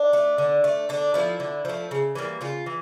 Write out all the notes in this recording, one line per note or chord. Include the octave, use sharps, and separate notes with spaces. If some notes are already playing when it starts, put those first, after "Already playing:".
Already playing: D4
A3
D3
A3
D3 D4
F3 A3 E4
D3
F3 A3
C#3
E3 G3 A#3
C#3 F4
E3